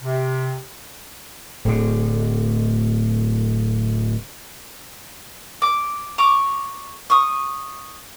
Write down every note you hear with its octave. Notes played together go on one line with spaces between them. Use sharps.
C3
D1 D3
D6
A#5 C#6 D6
C#6 D#6